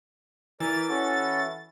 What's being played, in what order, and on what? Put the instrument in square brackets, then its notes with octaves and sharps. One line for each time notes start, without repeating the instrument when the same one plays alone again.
[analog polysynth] E3 A6 [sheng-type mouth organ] A#4 D5
[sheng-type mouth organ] C#4 F#4 A4